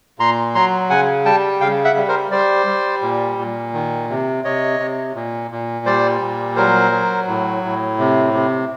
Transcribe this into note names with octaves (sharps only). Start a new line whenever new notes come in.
A#2 A#5 C6
F#3 A#5 C6
C#3 F#5 G#5
G3 G5 A5
C#3 F5 G5
E5 F#5
G3
A#4 C5
G3 C5 D5
G3
A#2
A#2
D#3
C3
C3 C#5 D#5
C3
A#2
A#2
G3 C5 D5
A#2
F#3 A#4 C5
F#3
A2
A2
C3
C3